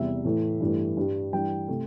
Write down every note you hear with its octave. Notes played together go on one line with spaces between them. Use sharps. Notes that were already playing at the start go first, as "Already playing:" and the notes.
Already playing: E2 C3 G3 E5
A2 E3 A3
G2 E3 A3
G2 G3
G2 E3 G3 G5
C3 A3